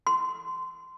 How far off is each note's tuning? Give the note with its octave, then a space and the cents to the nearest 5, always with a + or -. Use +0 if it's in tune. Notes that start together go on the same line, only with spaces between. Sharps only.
C6 -15